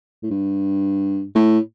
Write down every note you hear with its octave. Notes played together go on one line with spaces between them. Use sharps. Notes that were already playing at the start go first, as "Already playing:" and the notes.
A2
G2
A2